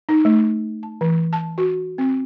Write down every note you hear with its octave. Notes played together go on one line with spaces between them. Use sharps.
D#4
A3
A5
E3
A5
F#4
C4